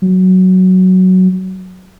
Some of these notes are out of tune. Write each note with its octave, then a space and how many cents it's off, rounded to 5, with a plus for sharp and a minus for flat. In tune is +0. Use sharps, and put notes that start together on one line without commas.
F#3 +5